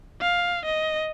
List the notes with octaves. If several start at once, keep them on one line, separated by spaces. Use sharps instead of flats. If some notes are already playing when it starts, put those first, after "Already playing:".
F5
D#5